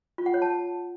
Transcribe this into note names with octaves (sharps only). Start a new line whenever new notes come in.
F4
F#5
C#5
A5